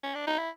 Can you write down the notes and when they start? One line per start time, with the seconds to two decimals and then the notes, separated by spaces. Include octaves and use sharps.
0.03 C#4
0.15 D4
0.27 D#4
0.38 E4